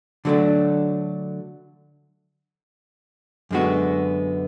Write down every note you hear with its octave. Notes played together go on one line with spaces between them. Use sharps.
D3 F#3 A3 D4
F#2 D3 G#3 B3 F#4